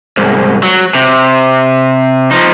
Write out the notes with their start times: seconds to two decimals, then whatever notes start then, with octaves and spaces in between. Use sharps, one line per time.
0.17 C2 G#2
0.63 F#3
0.95 C3
2.31 F3 D#4